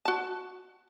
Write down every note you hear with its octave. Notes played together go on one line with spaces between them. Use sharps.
F#4 A5